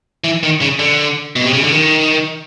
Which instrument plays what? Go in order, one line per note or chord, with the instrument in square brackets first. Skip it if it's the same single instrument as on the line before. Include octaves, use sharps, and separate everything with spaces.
[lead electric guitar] E3
D#3
C#3
D3
B2
C3
C#3
D3
D#3